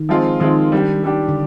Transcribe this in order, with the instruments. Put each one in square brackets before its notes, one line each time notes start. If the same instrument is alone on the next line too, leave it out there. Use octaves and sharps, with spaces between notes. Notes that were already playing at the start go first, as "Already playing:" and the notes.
Already playing: [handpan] D#3
[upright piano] F3 G#3 C4 F4
[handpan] D#3 [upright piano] F3 G#3 C4 F4
[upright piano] G3 D4 G4
G3 D4 G4
[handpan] D3